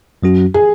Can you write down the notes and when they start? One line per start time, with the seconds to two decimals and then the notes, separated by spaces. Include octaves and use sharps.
0.22 F#2 F#3 C#4 F#4
0.54 G#4